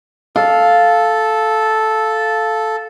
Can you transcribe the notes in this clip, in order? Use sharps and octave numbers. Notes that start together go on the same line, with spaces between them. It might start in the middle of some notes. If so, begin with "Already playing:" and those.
A4 F5